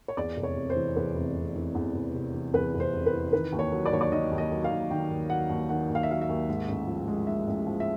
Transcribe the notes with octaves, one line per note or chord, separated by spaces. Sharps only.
C#5
E2 D5
F1
C#5
C3
C5
E3
E2 B4
F1
C3
E3
E2
F1
C3
E3
E2 B4
F1
C5
C3
B4
E3
D#3 B4
D#2
C#5
F#3
D5
D#2 C#5
D5
D#3 D#5
D#2
D#5
F#3
F5
D#2
D#3 G5
D#2
F#3 F#5
D#2
D#3 F#5
D#2
F5
E5
F#3 F5
E5
D#2
G#2
A1
F3
G#3
G#2 E5
A1
F3
E5